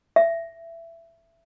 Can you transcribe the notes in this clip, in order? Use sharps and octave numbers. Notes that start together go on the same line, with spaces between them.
E5